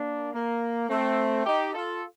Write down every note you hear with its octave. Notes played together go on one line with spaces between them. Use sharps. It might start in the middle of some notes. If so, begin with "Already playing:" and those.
Already playing: A#3 D4
A#3
A3 C4
D#4 G4
F4 A4